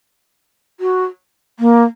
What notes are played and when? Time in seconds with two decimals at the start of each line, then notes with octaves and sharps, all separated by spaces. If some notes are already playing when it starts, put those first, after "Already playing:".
0.80 F#4
1.59 A#3